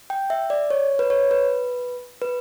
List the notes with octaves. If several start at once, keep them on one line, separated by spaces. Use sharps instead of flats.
G5
E5
D5
C#5
B4
C#5
B4
B4